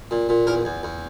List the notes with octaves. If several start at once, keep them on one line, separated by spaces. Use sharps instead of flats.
A#2
A#2
E2 A#4
E2
E2